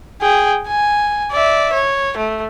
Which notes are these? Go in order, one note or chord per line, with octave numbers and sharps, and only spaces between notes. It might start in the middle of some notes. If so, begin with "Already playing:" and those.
G#4 G5
G#5
D5 E5
C#5
A3